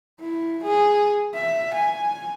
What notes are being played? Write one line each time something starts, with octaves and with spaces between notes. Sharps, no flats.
E4
G#4
E5
G#5